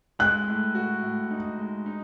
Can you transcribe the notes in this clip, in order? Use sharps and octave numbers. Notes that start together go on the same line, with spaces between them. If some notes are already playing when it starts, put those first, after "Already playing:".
G#3 F#6
A2
F#4
A2
D#4
G#3
D#4